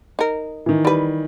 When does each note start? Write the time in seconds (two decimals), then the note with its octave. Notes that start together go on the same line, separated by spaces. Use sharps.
0.19 D#4 A#4
0.66 D#3 E3
0.85 G3 B4